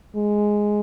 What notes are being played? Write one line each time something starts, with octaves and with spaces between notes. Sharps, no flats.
G#3